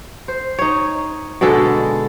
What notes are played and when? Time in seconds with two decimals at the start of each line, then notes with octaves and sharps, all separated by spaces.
0.28 C5
0.58 D#4 C#5
1.41 B2 D3 G#3 A4